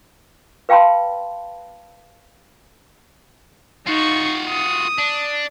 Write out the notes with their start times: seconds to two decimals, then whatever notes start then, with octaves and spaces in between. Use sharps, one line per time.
0.69 B4 F5 G5 A5 B5 C6
3.87 D#4 F4 F#4 C#6
4.49 D#6
4.98 D4